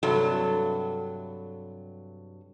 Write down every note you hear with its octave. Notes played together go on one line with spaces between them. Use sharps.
G2 C3 F#3 A4